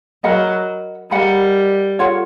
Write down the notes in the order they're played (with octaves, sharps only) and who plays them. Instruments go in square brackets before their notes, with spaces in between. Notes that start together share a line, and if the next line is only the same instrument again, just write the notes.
[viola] F#3 [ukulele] A#4 D#5 F#5 B5
[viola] G3 [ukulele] A#4 D#5 F#5 B5
[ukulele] F4 A4 C#5 F#5